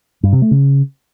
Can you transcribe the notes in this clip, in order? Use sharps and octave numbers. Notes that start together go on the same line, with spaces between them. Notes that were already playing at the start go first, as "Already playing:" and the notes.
G2
C3
A3
C#3